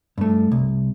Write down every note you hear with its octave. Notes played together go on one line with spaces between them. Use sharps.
G2 A3
C2